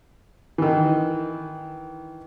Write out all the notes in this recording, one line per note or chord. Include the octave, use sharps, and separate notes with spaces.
D#3 E3